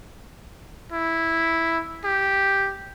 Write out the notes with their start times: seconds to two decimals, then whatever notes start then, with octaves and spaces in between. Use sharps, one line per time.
0.92 E4
2.04 G4